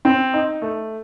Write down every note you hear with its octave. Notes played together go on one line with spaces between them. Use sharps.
C4
D#4
A3